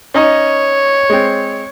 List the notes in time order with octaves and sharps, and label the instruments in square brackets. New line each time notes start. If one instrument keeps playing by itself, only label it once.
[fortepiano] C#4 D#4 D#5 [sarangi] C#5
[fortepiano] G#3 C4